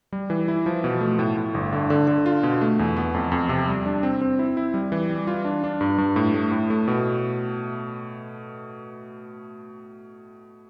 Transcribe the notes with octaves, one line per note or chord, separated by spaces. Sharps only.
G3
E3
E4
F3
B2
A3
A2
A2
G1
D3
D3
D3
F4
B2
A3
E2
B3
F2
F2
C3
G3
D4
C4
C4
E4
E4
G3
E3
G3
F4
D4
D4
G2
G2
A2
A3
A2
A3
B2